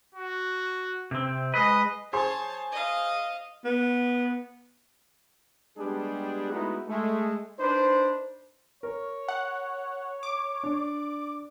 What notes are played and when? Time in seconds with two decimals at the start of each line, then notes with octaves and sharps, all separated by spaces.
0.15 F#4
1.11 C3 C4
1.54 G#3 B4 D#5
2.13 G#4 C5 C#5 A5 C6
2.71 D#5 F5
3.65 B3
5.77 G3 G#3 B3 D4 G4 G#4
6.51 G#3 A3 B3 D#4 E4 F#4
6.87 G#3 A3
7.59 D4 D#4 B4 C5
8.83 A#4 C#5
9.28 F#5
10.23 D6
10.63 D4
10.75 D5